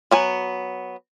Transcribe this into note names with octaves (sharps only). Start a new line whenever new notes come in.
F#3 B3 G#5